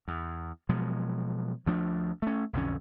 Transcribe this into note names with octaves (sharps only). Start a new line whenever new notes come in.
E2
B2 F3 F#3 G#3
D2 F3 A3 D4
A3 C#4
B1 F2 D3 C#4